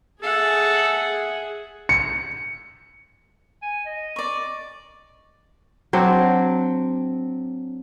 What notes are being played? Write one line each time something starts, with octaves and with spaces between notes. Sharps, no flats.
G#4 A4 E5 F#5
C#7
G#5
D#5
D5 C#6
F#3 C4 D4